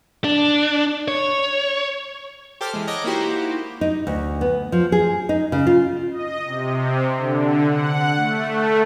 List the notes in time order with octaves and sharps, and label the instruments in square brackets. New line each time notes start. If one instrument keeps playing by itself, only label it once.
[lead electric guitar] D4
C#5
[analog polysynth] G4 A4 C5 D6 F6
E3 G#3
C#5 D#5 F#5 A#5 D6
A#3 D#4 E4 F#4 G4 C5
[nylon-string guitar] D#4
D2
B3
F3
G#4
D#4
C#3
F4
[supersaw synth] D#5
C3
D3
F#5
A3